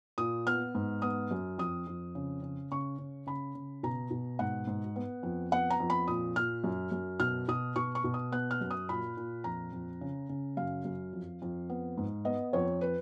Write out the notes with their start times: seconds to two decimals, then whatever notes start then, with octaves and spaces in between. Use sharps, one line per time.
0.18 A#2 D#6
0.46 B3 F6
0.75 G#2
1.02 B3 D#6
1.31 F#2
1.58 F2 D#6
1.87 F2
2.15 C#3
2.42 C#3
2.71 C#3 C#6
2.98 C#3
3.27 C#3 B5
3.55 C#3
3.83 B2 A#5
4.11 B2
4.39 G#2 F#5
4.67 G#2
4.96 B3
5.23 F2
5.52 B3 F#5
5.70 A#5
5.80 F2
5.90 B5
6.08 A#2 D#6
6.36 A#2 F6
6.64 F#2
6.92 F#2
7.20 B2 F6
7.48 B2 D#6
7.76 B2 C#6
7.95 C#6
8.04 B2
8.14 D#6
8.32 B3 F#6
8.51 F6
8.61 F#2
8.71 D#6
8.89 A#2 B5
9.17 A#2
9.44 F2 A#5
9.72 F2
10.01 C#3
10.29 C#3
10.57 F#2 F5
10.85 F#2
11.13 F2
11.42 F2
11.70 B3
11.98 G#2
12.25 B3 D#5
12.53 F2 C#5
12.81 B4